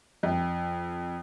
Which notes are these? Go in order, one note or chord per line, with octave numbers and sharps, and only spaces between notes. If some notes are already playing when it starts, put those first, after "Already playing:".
F2